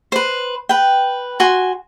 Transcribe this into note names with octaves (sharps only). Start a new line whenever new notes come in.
B4 C5
B4 G5
F#4 G#5 C6